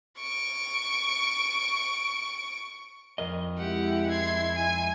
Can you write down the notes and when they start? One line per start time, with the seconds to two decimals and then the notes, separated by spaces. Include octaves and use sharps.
0.18 C#6 D7
3.18 F2 A#4 D#5
3.58 G#3 E4 G4 F#5
4.11 C6 G#6
4.55 G#5